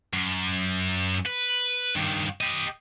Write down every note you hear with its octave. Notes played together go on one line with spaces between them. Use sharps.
F#2
B4
G2 D#3
G4 D#5